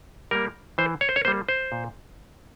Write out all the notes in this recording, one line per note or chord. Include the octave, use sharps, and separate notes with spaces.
G3 A#3 A#4
E3 C5
C#5
C5
C#5
G3 A#3 C5
C5
A#2